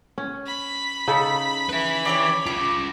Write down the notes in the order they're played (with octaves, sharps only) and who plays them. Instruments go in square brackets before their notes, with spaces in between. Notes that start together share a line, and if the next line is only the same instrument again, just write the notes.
[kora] C#4
[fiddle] B5
[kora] C#3 D#4 A4
[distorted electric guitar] B4 E5
[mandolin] D4 G4 C#5
[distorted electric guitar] F4 G#4 [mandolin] D6